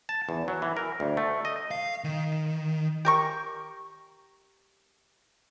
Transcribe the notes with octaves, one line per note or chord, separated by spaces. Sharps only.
A5
E2
F#3
E3
A#4
D2
A3
D#5
F5
D#3
G4 A#4 C#6